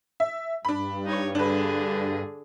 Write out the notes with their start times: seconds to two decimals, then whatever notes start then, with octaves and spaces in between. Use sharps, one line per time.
0.20 E5
0.65 G2 D4 B5
1.05 D#4 C#5
1.35 D3 D4 G#4 B4